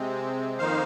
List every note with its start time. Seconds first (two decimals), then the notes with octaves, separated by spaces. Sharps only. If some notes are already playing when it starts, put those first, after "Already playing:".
Already playing: C3 G#3 C4
0.58 F2 D#3 A#3 D#4 C5 F5